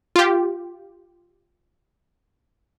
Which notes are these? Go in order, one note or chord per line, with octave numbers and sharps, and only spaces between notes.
F4 G4